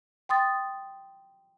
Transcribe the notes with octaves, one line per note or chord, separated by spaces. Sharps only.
G5 C6 D#6 A6